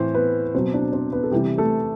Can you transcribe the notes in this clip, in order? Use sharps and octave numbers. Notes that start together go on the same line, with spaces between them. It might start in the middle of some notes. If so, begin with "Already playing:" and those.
Already playing: A2 E3 C4 C5
B3 B4
B2 F#3 C4 C5
D4 D5
C4 C5
B3 B4
A4
C3 E3 G3 G4
A3 A4